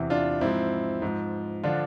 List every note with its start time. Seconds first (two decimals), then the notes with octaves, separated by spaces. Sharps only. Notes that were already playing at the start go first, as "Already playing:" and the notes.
Already playing: E2 C3 E3
0.10 D4 F4
0.41 G#2 F3 C4 E4
1.02 G#2 F3
1.64 D3 F3 D4 F4